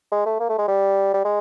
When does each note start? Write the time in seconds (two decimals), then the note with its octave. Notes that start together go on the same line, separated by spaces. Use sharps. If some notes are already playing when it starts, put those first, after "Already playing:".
0.12 G#3
0.26 A3
0.40 A#3
0.49 A3
0.58 G#3
0.68 G3
1.14 G3
1.25 G#3